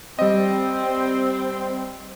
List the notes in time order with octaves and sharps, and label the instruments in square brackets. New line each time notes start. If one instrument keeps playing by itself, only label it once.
[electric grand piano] G3 D#5 [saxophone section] C4